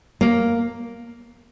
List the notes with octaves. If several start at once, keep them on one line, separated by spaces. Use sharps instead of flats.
A#3